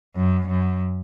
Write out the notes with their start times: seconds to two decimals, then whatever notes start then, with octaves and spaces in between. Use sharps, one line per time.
0.16 F#2
0.48 F#2